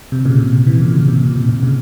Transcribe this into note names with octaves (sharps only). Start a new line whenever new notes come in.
C3
A#2 C#3
C3
C3
C3 E3
A#2 C#3
A#2 C#3
C3
A#2
C3
C3
A#2 C#3